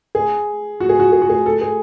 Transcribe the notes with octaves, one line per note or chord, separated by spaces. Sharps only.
G#4
F#4
G#4
F#4
G#4
F#4
G#4
A4
G#4